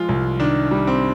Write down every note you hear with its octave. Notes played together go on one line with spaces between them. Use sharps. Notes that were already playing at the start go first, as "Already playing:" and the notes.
Already playing: F3 G#3 F4
C2
D#3 D4
G3
C4